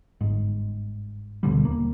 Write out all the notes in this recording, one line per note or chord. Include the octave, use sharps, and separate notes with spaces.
G1 G#2
D1 B2 D3 G3
D#1 A#3